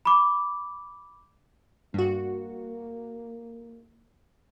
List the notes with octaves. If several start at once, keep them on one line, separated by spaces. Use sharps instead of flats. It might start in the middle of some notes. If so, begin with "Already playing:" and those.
B5 D6
G2 A#3 F#4